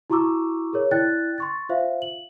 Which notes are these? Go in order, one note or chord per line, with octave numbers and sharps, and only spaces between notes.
E4 F#4 A#5 C#6 D6 E6
G#4 A#4 C#5
E4 D5 G5 F#6 A6
C6 C#6 A6
F4 C5 E5 F5
F#7